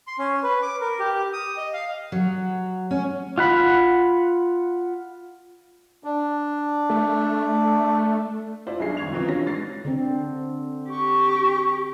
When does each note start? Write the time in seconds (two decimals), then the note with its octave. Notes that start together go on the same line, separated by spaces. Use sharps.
0.07 C6
0.19 C#4
0.43 B4
0.63 D6
0.81 A#4
0.99 G4
1.33 D#6
1.57 D#5
1.73 F5
2.12 F#3
2.91 C#4
3.38 F4 F#5 B5
6.04 D4
6.90 A3
8.67 E4 F4 C5 D5
8.80 B1 G2 G#4 C7
8.97 F2 C#6 G#6 F7
9.12 F#2 B2 E3 F3 C4 F4
9.27 D3 F#3 G3 F4 C#5 A#6
9.47 G#2 A6 C7
9.85 D3 C4
10.90 G4 C#6